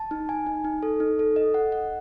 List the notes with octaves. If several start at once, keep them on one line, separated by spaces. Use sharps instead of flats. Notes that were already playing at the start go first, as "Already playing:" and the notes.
Already playing: A5
D#4
G#5
D#4
D#4
A4
D#4
A4
D#5
F#5
F#5